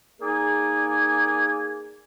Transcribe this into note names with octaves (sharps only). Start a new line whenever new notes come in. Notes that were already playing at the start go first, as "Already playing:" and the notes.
A#3 D#4 G#4 D5 G#5